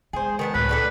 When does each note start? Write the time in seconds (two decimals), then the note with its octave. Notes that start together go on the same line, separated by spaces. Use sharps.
0.13 G#3 G#4 C5
0.39 D#3 B3 A5
0.54 C#2 A2 F#3 B4
0.69 D4 G4 A4